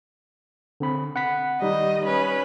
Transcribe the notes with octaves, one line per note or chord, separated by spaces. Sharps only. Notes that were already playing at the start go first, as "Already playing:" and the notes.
D3 C4 B5
F#5 B5 B6
D#3 G3 D#4 D#5
C#4 B4